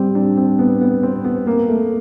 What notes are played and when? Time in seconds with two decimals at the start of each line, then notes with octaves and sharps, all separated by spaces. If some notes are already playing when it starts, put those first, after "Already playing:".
Already playing: G3 C4
0.15 D4
0.37 C4
0.59 B3
0.81 B3
1.03 C4
1.25 B3
1.47 A#3
1.68 A3